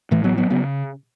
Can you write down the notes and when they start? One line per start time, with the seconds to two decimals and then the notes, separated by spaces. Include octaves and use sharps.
0.11 A1 A2 E3 A3
0.24 F#3 B3
0.37 F#3 B3
0.50 C#3 F#3 B3